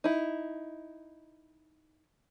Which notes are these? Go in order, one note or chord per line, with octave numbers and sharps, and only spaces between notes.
D#4 E4